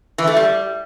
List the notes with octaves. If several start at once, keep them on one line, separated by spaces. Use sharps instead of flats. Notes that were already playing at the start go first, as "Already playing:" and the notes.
E3
A3
G3